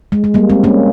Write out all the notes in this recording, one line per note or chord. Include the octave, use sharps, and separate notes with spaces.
G#3
G#3
G3 A#3
G#3 C4
A#3 C#4